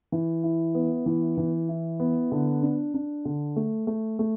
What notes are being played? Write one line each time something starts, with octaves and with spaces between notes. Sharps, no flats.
E3
E4
B3
E3
E3
E4
B3
D3
D4
D4
D3
A3
A3
A3